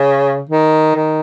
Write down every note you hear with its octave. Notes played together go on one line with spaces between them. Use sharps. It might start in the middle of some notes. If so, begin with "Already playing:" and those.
Already playing: C#3
D#3
D#3